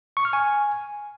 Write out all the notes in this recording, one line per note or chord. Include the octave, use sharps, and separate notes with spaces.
C#6
F6
G#5